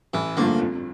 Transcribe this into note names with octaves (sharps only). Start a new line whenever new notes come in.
A1 E3
G2 D3 F3 A3 A#3
F2